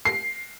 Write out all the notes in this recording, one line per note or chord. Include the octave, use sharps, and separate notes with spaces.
C7